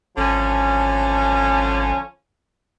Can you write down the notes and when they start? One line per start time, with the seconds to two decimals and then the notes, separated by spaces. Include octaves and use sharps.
0.18 G#1 D3 F3 C#4